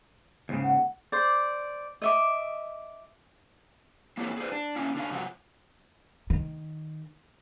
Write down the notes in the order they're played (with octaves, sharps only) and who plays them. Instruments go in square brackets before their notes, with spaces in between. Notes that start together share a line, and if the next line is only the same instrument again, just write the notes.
[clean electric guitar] D#2 G#2 C#3
[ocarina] F#5
[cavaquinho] C5 D5
D#5 E5 D6
[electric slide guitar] A#3 C4 E4 G4 A4 C#5
G#4 A4 B4 C5 D5
D4
A#3 C#4 E4 F5
D3 D4 F5
G2 C3 F3 F#3 F#5
[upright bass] D#3